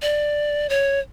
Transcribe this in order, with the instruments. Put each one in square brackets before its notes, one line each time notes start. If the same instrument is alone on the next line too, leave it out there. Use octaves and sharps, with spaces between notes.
[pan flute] D5
C#5